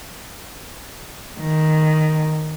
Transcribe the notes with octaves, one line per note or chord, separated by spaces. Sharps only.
D#3